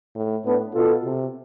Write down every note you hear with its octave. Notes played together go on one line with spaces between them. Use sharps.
A2
A2 B3 D4
B2 F4 A4
C3